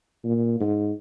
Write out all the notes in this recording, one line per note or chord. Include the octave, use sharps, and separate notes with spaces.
A#2
G#2